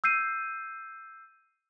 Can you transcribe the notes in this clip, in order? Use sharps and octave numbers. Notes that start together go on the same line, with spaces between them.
E6 G6 C7 D#7